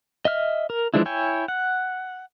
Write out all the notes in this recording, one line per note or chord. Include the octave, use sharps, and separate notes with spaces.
D#5 E5 F6
A#4
E3 F3 G#3 D4 E4
E4 C#5 G5 G#5
F#5